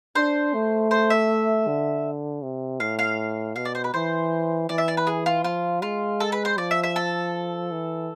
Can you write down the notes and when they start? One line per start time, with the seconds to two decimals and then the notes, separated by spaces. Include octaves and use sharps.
0.15 D4 C5
0.54 A3
0.91 C5
1.10 E5
1.67 D3
2.42 C3
2.80 A2 F5
2.99 F5
3.56 B2 F5
3.65 D5
3.75 C5
3.84 B4
3.94 E3 C5
4.69 E3 D5
4.78 E5
4.88 D5
4.97 B4
5.07 G#4
5.26 F4
5.44 F3 F4
5.82 G#3 F4
6.20 A4
6.32 B4
6.45 C5
6.57 F3 D5
6.71 E5
6.83 E5
6.96 A4
7.72 E3